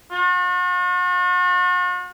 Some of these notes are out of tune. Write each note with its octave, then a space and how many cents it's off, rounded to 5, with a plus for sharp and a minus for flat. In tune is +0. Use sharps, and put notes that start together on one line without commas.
F#4 -45